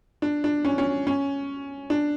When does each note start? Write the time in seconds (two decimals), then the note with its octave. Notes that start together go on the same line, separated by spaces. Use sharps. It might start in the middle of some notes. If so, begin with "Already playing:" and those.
0.22 D4
0.44 D4
0.65 C#4
0.78 C#4
1.07 C#4
1.90 D4